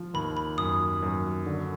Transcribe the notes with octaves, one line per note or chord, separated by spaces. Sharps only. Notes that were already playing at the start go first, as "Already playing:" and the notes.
Already playing: F3
D#2 B5
B5
F#2 D#6
F#2
D3